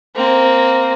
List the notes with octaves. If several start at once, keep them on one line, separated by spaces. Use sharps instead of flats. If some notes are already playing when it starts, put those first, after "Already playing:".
A#3 C4